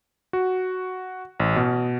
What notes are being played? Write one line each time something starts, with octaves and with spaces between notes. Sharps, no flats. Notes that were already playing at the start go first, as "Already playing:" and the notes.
F#4
A1
B2